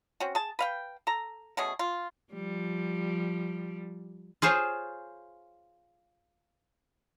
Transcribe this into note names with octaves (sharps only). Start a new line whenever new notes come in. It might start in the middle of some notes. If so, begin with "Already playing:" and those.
C4 C#4 F#4
G#4 A5
B4 F5 G5
A4 A#5
B2 A3 C#4 G#4
F4
F3 G3
F4 G#4 C5 C#5